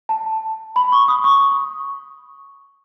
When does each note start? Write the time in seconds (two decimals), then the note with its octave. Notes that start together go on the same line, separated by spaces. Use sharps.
0.09 A5
0.76 B5
0.92 C#6
1.08 D#6
1.24 C#6